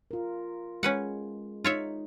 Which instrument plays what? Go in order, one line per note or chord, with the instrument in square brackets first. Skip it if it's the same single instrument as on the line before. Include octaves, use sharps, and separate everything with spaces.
[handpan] F4 A#4
[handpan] G#3 [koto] C#4 B4 F#5
[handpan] D#4 [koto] F4 C#5 E5